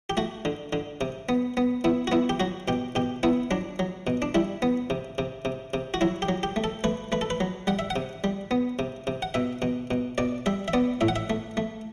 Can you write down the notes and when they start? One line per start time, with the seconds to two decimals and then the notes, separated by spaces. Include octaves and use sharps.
0.10 G4
0.17 A3 F#4
0.45 D3
0.73 D3
1.01 C3
1.29 B3
1.57 B3
1.84 B3 E4
2.07 F#4
2.12 B3 E4
2.29 G4
2.40 F#3 F#4
2.68 B2 G4
2.95 B2 G4
3.23 B3 E4
3.51 F#3 D4
3.79 F#3
4.07 B2
4.22 D4
4.35 G3 E4
4.62 B3
4.90 C3
5.18 C3
5.45 C3
5.74 C3
5.94 F#4
6.01 F#3 E4
6.22 G4
6.29 F#3
6.43 G4
6.56 A3
6.64 A4
6.84 A3 B4
7.12 A3 B4
7.21 A4
7.30 B4
7.40 F#3
7.67 G3 F#5
7.79 E5
7.90 F#5
7.96 C3
8.24 G3
8.51 B3
8.79 C3
9.07 C3
9.22 F#5
9.34 B2 E5
9.62 B2
9.91 B2
10.18 B2 D5
10.46 G3 E5
10.68 E5
10.73 B3 D5
11.01 A2 E5
11.08 F#5
11.16 E5
11.30 A3
11.57 A3